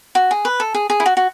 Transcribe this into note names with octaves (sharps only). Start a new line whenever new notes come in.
F#4
G#4
B4
A4
G#4
G#4
E4
F#4
F#4